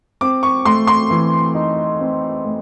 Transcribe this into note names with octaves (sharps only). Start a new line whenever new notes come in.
C4 D6
C#6
A3 C6
C6
E3
D#4
C4
A3